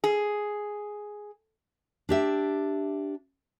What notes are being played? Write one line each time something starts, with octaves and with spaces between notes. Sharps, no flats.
G#4
D4 G4 E5